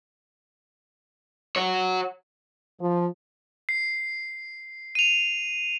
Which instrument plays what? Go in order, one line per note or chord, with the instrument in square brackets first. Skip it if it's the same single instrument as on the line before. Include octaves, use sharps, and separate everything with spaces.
[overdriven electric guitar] F#4 C#5
[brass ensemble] F3
[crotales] C7
D#7 F7